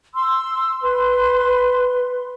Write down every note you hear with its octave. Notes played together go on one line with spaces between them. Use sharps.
C6 E6
B4 C6